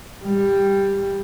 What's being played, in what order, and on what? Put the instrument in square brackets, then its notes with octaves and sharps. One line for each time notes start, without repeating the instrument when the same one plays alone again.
[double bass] G3